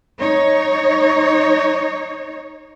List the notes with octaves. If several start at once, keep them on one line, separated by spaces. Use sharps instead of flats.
D#4 C#5